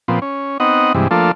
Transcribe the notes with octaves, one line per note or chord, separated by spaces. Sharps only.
A#2 F3 B3 C4
C#4
B3 C4 D#4 D#5 F#5
G2 C3 E3 G#3
F3 A3 A#3 D4 F4 A4